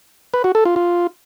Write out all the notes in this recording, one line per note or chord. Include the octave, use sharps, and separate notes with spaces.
B4
F#4
A4
F4
F4